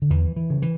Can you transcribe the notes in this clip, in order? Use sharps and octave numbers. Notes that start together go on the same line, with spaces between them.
D3
E2 E3
E3
C#3
E3